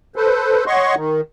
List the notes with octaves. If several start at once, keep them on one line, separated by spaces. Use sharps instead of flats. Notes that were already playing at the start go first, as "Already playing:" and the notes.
A4 B4 C5
C#5 D#5 F#5 C6 C#6
D#3